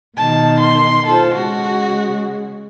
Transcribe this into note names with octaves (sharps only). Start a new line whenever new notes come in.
B2 D#3 A5
C6
F4 A4 C5
C#3 G#3 F#4